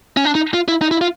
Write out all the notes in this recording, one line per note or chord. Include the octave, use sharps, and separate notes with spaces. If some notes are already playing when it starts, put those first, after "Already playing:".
C#4
D4
D#4
F4
E4
D#4
E4
F4